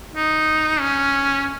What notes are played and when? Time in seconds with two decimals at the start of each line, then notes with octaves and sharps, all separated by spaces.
0.14 D#4
0.80 C#4